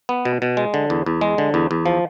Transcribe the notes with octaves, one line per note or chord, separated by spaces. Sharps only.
B3
B2
B2
G#3
D3
E2
E2
G#3
D3
E2
E2
F3